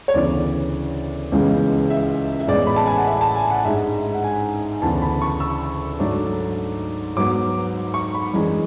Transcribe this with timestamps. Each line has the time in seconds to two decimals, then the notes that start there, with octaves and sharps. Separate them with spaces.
0.08 C#5
0.14 D2 C#3 E3 B3 D4 D5
1.32 C#2 C#3 E3 G#3 B3
1.90 E5
2.40 E5
2.48 A1 A2 G#3 B3 D5
2.67 B5
2.76 A5
2.86 G#5
2.97 F#5
3.07 E5
3.21 A5
3.35 G#5
3.50 F#5
3.65 G#2 G#3 D4 E5
4.14 F#5
4.24 G#5
4.82 D2 C#3 E3 B3 D4 A5
5.02 B5
5.22 C#6
5.40 E6
5.99 G#2 F#3 A3 D4
7.16 G#2 F#3 B3 D6
7.94 C#6
8.14 B5
8.33 F#2 E3 G#3 D4